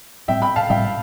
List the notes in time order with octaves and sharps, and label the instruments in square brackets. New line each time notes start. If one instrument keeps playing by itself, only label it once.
[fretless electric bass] A2 G3 C4 [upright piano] E5 G5
[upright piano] G5 B5
F5 A5
[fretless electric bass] A2 G3 C4 [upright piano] E5 G5